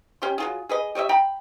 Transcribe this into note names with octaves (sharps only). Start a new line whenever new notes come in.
C#4 G4 C6
F#3 F4 G#4
G#4 B4 D#5
G4 C#5 D#5 E5
G5 A#5 B5